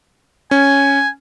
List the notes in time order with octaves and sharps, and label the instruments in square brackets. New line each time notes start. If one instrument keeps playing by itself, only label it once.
[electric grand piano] C#4 [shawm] G#5